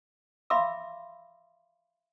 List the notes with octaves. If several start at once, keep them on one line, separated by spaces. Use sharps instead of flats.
E5 F5 B5 C6 D6 E6